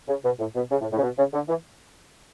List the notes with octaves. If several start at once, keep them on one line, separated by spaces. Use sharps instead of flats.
C#3
B2
A2
B2
C#3
A2
A2
C#3
B2
C#3
D3
E3